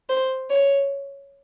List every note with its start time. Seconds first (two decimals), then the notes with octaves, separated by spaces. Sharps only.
0.09 C5
0.50 C#5